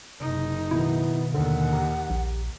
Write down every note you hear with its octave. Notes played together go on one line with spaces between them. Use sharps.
F#1 C3 D#4
B2 D#3 B3 E4
D#2 A#2 D3 F#5
G4 A#5
A#1